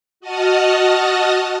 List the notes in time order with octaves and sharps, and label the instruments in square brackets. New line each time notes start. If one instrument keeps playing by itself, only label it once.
[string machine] F#4 D#5 F#5 A5 D#6 F6